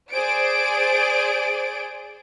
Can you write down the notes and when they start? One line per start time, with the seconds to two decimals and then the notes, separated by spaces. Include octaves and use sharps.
0.11 G#4 C5 D5 D7